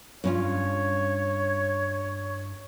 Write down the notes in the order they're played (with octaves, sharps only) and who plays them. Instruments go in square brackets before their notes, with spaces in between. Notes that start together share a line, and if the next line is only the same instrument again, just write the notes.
[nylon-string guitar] G2 C#4 F4 [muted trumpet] C#5